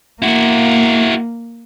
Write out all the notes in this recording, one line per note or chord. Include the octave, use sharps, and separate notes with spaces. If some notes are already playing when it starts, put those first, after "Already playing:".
A#3 E4 F#4